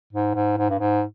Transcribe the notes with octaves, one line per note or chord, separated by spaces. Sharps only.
G#2
G#2
G#2
G2
G#2